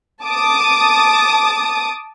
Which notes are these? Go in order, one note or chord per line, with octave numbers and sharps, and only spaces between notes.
A5 D6 D#6